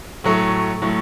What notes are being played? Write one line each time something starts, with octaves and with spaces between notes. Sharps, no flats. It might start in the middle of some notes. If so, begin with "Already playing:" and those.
A2 F#3 A3
A2 F#3 A3